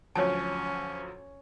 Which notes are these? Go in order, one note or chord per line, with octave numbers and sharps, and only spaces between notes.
D2 F3 F#3 C#4 C#5 A5